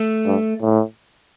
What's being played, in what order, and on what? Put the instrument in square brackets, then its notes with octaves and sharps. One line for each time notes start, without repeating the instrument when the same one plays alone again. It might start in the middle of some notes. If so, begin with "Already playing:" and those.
Already playing: [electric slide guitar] A3
[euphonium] G2
A2